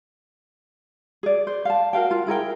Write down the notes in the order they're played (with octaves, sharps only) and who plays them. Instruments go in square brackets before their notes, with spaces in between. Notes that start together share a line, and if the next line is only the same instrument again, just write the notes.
[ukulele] G#4 D5
C5
F5 A5
F#4 A#4 F5 G5
F4
E4 G#4 A#4 G5